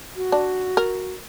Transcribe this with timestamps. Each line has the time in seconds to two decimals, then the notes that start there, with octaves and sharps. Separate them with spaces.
0.16 F#4
0.32 D4
0.77 A#4